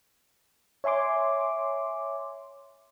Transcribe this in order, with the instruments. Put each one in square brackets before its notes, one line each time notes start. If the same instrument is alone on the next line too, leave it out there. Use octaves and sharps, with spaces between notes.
[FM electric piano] C#5 E5 G#5 C6 D6